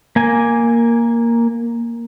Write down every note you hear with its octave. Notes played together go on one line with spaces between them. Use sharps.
A#3 G#5